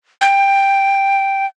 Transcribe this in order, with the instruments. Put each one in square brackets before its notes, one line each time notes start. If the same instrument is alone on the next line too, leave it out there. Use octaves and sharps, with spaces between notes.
[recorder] G5